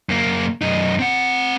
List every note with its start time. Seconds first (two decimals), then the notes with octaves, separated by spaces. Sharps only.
0.09 F#2 A#3
0.62 F#2 D#4
0.99 C4 F#5